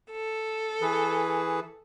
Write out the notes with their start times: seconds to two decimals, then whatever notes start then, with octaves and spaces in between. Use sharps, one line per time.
0.11 A4
0.82 E3 G#4 B4